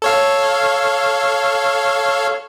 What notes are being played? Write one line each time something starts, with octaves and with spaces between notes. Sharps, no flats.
A4 C#5 F5